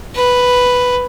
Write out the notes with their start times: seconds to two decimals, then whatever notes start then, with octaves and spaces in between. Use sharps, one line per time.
0.16 B4